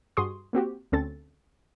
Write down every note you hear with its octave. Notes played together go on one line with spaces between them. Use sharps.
G2 F#4 G#4 C6 C#6 D#6
A#3 C4 F#4 G4
D2 D3 C4 C#4 A4 A6